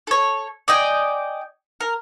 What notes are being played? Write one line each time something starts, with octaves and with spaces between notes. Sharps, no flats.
A4 C#5
D5 D#5 G5 G#5
A#4